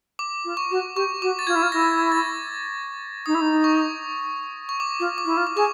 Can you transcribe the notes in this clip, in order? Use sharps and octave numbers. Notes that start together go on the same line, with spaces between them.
D6
F4
C#6
F#4
G4 C#6
F#4 D6
A6
F4 G#6
E4
F4
E4 A#6
A6
D#4 D#6
E4
D#4
C#6
C#6
D6
F4
D6
E4
F4
D6
G#4 C#6